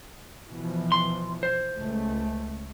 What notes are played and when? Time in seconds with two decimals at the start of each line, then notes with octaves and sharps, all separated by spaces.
0.49 B2 E3 F3
0.92 C6
1.43 C5
1.78 C#2 A3